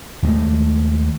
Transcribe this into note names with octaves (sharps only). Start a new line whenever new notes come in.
D#2 G#3 A3